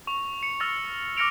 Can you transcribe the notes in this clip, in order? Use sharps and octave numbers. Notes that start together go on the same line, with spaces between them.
C#6 F7
C#7
C#6 E6 F6 A6 A#6 F7
D6 F6 A#6 C#7 D7 F7